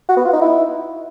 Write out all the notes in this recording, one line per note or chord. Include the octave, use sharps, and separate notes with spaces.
F#4
B3
F4
D#4
E4